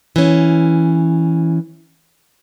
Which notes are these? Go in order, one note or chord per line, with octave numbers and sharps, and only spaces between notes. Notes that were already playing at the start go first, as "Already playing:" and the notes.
E3 C#4